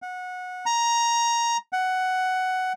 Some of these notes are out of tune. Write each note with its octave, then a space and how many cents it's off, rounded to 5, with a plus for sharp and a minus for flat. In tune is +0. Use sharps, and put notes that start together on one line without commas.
F#5 -20
A#5 +10
F#5 +10